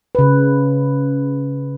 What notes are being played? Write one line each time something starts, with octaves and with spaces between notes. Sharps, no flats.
C#3 B4